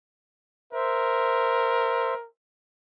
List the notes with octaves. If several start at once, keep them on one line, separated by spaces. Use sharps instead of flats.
A#4 C5 E5